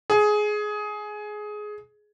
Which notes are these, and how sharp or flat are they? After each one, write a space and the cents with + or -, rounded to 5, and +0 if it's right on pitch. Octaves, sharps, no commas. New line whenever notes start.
G#4 +15